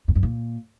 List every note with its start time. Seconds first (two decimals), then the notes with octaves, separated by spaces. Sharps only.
0.08 F2
0.15 F#2
0.23 A#2